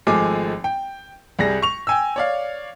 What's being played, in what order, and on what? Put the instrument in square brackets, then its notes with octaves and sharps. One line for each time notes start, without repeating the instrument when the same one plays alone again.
[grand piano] G#1 F3 G#3 A3 G#5 D6
G5
C2 G3 G#4 A#6
C#6 F7
G5 G#5 E6
C#5 D5 F5